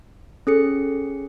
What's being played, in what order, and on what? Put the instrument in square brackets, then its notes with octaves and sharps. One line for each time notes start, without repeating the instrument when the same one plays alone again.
[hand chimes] C#4 G#4 C#7 [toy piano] A4